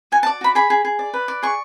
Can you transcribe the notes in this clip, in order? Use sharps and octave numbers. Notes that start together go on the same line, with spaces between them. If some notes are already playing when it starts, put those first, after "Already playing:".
F#4 G#5
A5
D5
F#4 B5
G#4 B5
G#4
G#4
D5
B4
D5
G#4 C#6